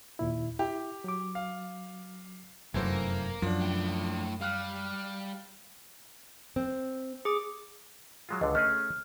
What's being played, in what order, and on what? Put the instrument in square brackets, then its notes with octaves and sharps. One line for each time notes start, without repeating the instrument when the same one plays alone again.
[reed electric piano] D#2 A#2 E4
[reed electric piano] E4 [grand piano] G4
[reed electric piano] F#3 D6
[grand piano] F5
[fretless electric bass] F1 F#2 [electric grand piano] E3 A4 C5 [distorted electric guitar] A#3
[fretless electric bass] F#2 [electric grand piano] F3 D4
[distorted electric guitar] A2 G5
[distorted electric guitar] G3 [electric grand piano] F5 F6 F#6
[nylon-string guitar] C4
[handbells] G#4 D6
[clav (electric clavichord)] F#3 G#3 F4
[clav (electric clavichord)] C#2 D3 [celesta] D#5
[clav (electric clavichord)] A3 C#4 G#4 [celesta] F6